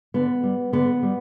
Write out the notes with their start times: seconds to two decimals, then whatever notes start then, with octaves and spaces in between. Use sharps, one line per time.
0.14 D3 B3
0.43 G3
0.73 D3 B3
1.03 G3